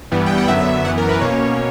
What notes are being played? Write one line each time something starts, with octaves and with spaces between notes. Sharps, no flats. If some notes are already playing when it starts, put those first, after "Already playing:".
G2 E3 G3 B3
G5
F#5
F#2 D3 F#3 B3 E5
F#2 E3 B3 F#5
A#4
B4
B2 A#3 C#4 C#5